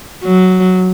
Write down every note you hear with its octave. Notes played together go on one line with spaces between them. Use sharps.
F#3